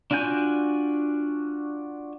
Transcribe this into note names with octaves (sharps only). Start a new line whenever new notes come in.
D4 F4 F#4 G#5 G6